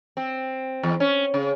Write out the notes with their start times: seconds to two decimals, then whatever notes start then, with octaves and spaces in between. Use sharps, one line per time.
0.17 C4
0.83 E2
1.00 C#4
1.34 C#3